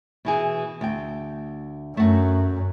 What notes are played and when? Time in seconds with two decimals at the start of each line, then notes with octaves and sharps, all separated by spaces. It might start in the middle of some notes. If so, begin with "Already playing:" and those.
0.25 B2 E3 G#4
0.81 D2 G5
1.97 F#2 A3 F#4